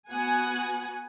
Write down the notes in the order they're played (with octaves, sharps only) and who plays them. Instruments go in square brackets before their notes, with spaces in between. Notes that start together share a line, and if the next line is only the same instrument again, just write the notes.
[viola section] B3 F#4 F#5 G#5